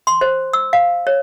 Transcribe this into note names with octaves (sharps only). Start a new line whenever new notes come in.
C6
C5
E6
F5
C#5